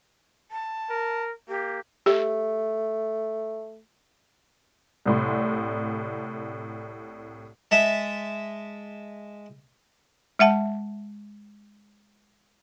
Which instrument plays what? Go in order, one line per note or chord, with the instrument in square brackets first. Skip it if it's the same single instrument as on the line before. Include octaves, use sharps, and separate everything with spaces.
[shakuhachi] A5
[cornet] A#4
[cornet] A#3 [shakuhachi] G4
[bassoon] A3 [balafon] G4
[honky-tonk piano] C2 A2 C6
[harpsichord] G#3 E5 A5
[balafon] G#3 E5 F#5 A5